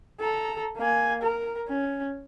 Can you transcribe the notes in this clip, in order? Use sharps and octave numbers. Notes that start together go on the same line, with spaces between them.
A4 A#5
A#3 G#5
A#4
C#4